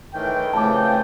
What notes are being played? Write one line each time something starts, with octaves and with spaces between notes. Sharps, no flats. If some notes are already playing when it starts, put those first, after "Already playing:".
A2 D#3 E3 G5
F2 C#3 E3 A3 A5 D6